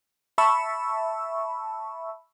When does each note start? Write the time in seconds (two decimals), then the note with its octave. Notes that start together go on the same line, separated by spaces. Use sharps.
0.38 E5 A5 B5 C#6 E6